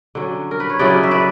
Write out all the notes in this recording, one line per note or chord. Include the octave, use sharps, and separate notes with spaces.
D3 F#3 C#4
A#4
B4
C#5
C#3 F#3 C#4 E4 B4 D5
E5
B4 D5